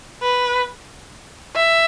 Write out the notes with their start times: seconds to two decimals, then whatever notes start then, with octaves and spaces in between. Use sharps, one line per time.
0.23 B4
1.56 E5